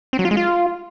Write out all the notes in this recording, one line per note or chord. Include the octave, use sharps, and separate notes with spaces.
C4
F#3
F4
G#3
F4